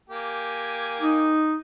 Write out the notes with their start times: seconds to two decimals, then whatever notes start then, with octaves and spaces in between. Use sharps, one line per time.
0.09 A#3 G4 G#5
1.01 D#4